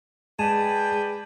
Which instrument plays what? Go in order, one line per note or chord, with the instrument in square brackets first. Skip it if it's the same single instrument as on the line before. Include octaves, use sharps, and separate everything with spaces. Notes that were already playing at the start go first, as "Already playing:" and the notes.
[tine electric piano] G#3 [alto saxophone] G#4 [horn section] B4 D5 G5 [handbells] A5